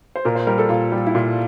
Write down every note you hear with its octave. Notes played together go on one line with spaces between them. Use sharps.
C5
A#2 A#4
C5
G3 A#4
A4
A#2 F4
G3
E4
A#2 F4